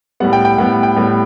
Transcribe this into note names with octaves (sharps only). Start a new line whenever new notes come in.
A2 G3 B3 F#5
G5
G5
A2 G3 B3 F#5
G5
A2 G3 B3